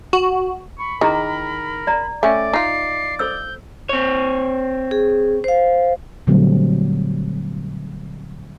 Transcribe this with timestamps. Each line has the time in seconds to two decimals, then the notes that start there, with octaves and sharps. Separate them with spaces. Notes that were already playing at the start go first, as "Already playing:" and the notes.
0.13 F#4
0.79 B5 C#6
1.01 D#3 E4 G#4 A#4 A#5
1.87 D5 A#5
2.23 A3 C#4 D5 E5 G5
2.53 D#4 F4 C7
3.19 A4 C5 E6 G6
3.89 C4 C#5
4.91 G#4
5.44 C5 F5
6.27 A#2 D3 F#3 G3 A3 C4